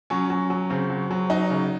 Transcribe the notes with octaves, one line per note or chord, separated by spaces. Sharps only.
F#3 C#4
F#3
F#3
C#3 C4
F#3
F#3
F#3 D#4
C#3